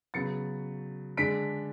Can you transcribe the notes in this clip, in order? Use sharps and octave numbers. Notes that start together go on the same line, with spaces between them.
C#3 F#3 B3 A6 C#7
D3 G#3 D4 B6 D7